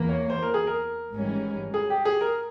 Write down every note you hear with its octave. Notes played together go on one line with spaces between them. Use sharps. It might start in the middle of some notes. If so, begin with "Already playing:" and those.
Already playing: E2 E3 A#3
C#5
C5
A#4
G#4
A#4
G#1 G#2 E3 G3 C#4
G#4
G4
G#4
A#4